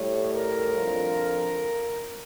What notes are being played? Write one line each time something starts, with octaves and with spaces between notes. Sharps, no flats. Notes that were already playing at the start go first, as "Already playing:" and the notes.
Already playing: A2 G3 C#5
A#4
F2 D3 F3